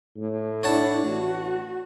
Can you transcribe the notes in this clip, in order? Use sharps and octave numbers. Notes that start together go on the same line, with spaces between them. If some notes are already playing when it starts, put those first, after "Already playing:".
A2
D4 E4 C#5 F#5 A5
A1 F#4